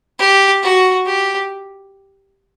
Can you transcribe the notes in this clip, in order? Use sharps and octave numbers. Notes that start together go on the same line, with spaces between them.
G4
F#4
G4